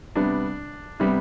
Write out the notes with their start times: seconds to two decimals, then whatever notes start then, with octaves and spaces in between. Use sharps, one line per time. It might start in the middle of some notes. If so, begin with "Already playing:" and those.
0.15 C3 G3 B3 D4
1.00 C3 G3 B3